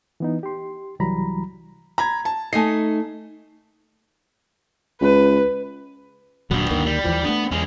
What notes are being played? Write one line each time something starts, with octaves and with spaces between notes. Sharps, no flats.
E3 B3 D#4
G4 C6
C2 E3 F#3 G3 A#5 B5
A#5 B5 G#6
A5
A3 D#4 D#5 G#5 C7
C#2 B4
D#1 G2 A#2 F#3 B3
D2 D#3 A#3
G3
D#2 E3 F3
A3 B3 D4
E2 G#3 C#4